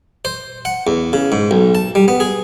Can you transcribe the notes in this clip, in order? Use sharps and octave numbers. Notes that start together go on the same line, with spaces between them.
C5
F#5
E2
C#3
G#2
B1
A5
G3
B3
G#4